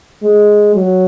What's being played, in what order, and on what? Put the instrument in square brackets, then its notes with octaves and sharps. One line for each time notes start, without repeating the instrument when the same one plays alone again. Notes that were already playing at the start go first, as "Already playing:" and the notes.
[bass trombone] G#3
F#3